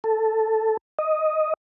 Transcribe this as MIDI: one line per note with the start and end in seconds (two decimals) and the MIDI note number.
0.04 0.77 69
0.99 1.54 75